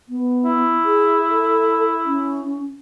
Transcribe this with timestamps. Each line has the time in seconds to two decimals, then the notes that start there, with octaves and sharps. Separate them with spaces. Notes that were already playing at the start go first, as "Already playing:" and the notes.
0.09 B3
0.45 E4
0.85 G#4
1.29 A4
2.05 C#4